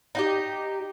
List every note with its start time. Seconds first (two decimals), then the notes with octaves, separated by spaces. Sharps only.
0.15 D#4 F#4 G4